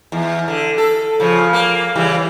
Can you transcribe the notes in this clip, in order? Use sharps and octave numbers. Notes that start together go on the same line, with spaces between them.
E2
D3
A4
C#3 F3
A#3
C#3 E3 G3